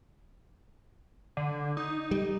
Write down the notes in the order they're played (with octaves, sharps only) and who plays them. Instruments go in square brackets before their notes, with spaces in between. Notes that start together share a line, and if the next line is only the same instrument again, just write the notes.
[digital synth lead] D3
D#4
[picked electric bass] G3